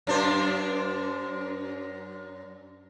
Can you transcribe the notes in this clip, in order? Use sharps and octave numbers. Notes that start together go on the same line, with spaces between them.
F#2 D4 C5